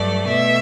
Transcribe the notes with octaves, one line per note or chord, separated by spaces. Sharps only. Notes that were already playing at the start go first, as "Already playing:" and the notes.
Already playing: G2 F#3 A3 D5
B2 A3 E5